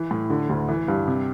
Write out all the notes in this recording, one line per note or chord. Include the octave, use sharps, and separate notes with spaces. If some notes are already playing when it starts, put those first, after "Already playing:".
Already playing: E3
A2
D3
D2
E3
G2
C3